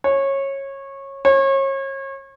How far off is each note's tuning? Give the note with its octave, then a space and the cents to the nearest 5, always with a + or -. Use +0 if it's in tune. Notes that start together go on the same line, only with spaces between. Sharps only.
C#5 -20
C#5 -35